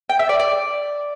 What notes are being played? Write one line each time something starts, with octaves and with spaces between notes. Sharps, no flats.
G5
E5
D5
D5